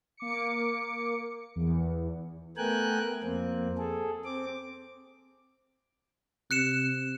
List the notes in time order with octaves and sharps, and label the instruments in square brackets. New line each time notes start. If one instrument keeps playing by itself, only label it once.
[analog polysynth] A#3 D6 C#7
E2
[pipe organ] A3 B3 A#4 G5 G#5 F#6
F2 A#3 C4
G#4 A4
C4 D6
[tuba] C3 [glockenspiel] F#6 C#7 E7